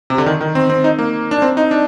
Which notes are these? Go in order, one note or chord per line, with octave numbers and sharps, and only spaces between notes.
C3
D3
D#3
D#3
C4
C4
D#4
A#3
D4
C4
D#4
D4